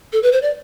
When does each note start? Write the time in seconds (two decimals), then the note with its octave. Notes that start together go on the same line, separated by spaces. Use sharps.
0.13 A4
0.23 B4
0.32 C5
0.42 D5